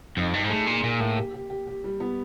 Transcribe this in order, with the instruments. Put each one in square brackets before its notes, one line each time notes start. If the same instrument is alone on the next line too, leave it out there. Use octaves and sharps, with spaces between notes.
[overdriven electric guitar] F2 [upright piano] D#4
[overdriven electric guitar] G2 [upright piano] D#4
[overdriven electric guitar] G#2
[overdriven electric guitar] A2 [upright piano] G#4
[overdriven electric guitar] A#2 [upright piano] G#4
[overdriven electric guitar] A#2 [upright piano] A#3
[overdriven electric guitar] A2 [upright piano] A#3
[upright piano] G4
G4
G4
G4
G3
B3